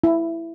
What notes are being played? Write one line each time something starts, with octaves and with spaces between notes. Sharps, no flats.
E4